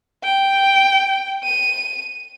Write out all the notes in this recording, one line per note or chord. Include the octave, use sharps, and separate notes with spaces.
G5
D#7